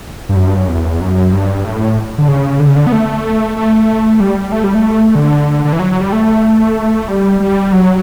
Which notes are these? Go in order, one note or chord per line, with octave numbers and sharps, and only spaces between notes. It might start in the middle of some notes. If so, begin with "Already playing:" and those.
G2
F#2
G2
F#2
E2
F#2
G2
A2
D3
C#3
D3
C#3
D3
B3
A3
A3
G3
A3
G3
A3
D3
D3
E3
F#3
G3
A3
G3
G3
F#3